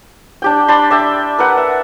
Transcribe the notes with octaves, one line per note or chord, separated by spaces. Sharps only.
D4 G4 G5
D4 D5 B5 C6
D5 E5 G5
A#4 B4 F#5
E5